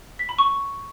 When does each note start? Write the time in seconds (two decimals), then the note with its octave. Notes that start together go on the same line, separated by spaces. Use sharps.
0.19 B6
0.29 B5
0.38 C#6